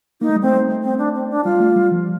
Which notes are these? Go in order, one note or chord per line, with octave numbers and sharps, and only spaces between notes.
A#3 D#4
A3
G3
A3 C4
C4
D4
C4
D4
G3 F4
A3
G3
F3